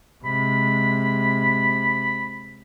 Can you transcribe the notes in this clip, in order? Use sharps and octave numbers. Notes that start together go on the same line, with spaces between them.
C3 G#3 B5